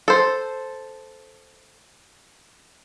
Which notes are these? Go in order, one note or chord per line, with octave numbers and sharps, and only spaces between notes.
A4 C5